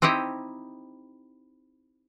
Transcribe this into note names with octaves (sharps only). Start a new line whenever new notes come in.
C4 D#4 E4 G4 D#5